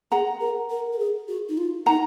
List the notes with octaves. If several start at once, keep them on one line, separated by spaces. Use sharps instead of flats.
G#4 F#5 A#5
A#4
A#4
A#4
G#4
F#4
D#4
F4
D#4 F#5 A#5